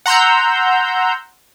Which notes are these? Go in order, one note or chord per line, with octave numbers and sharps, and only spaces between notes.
F#5 A#5 C6 E6 G6